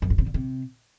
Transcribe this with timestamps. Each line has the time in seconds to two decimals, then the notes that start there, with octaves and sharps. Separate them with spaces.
0.02 F#2
0.10 G2
0.18 C3
0.26 D3
0.34 C3